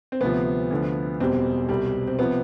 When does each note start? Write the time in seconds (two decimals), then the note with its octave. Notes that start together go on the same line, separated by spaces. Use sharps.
0.12 C4
0.21 D2 C3 F3 B3
0.71 D2 D3 F3
1.20 E1 E2 B2 G3 C4
1.69 C2 B2 G3
2.07 C4
2.19 C3 F3 B3